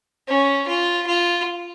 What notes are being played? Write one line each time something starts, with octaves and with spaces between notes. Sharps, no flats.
C#4
F4
F4